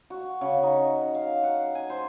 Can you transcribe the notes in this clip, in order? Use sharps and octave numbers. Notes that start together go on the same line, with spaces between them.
F#4
C#3
D#4
F5
F#5
G#5
C5